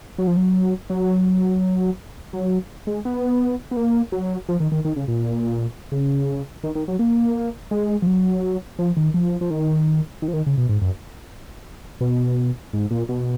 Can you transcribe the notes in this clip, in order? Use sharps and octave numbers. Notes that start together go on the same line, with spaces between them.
F#3
F3
F#3
F#3
F#3
G#3
B3
B3
A#3
F#3
F3
D#3
D#3
D#3
C#3
A#2
C#3
D#3
D#3
F#3
A#3
G#3
F3
F#3
F3
D#3
F3
F3
D#3
D#3
F3
D#3
C#3
B2
G#2
F#2
B2
G#2
A#2
B2